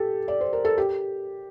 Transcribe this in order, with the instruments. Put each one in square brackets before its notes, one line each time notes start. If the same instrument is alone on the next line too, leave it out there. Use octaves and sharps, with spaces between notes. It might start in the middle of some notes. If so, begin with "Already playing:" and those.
Already playing: [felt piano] G4 A4
D5
C5
A#4
A4
G4